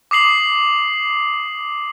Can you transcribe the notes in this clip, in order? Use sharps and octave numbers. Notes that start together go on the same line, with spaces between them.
D6 D#6 C7 F#7